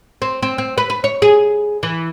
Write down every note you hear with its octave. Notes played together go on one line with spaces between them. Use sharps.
C4
C4
C4
B4
B4
C#5
G#4
E3